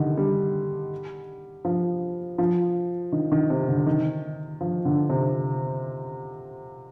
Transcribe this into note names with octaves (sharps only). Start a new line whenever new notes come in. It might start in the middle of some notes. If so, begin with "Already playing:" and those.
Already playing: D3 D#3 G3
G3
F3
F3
D#3
D#3
C3
D3
D#3
F3
D3
C3